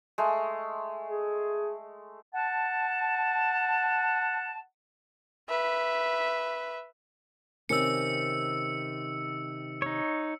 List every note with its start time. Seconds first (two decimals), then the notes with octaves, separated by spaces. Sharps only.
0.18 G#3 A3
1.09 G#4
2.34 F#5 A5
5.49 B4 E5
7.69 C3 D#3 C#4 E6 C#7
9.82 D#4 C#5